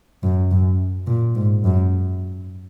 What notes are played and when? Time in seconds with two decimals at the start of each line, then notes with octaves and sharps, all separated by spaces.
0.23 F#2
0.51 F#2
1.07 A#2
1.36 G#2
1.64 F#2